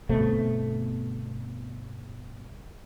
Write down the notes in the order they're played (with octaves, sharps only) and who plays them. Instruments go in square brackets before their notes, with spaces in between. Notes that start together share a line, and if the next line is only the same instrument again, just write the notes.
[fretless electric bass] G1 B2 A3 C4